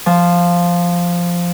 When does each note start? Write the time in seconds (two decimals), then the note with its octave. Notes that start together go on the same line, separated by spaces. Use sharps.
0.06 F3